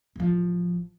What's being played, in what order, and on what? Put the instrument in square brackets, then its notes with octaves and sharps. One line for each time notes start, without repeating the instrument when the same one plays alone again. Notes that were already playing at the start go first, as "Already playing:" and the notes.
[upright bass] A1 F3